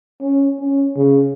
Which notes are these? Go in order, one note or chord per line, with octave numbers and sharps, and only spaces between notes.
C#4
C#4
C#3